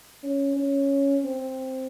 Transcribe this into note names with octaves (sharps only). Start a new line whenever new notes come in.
C#4
C#4
C4